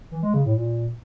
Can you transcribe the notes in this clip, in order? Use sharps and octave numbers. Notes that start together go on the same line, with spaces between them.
E3
G#3
C#3
A2
A#2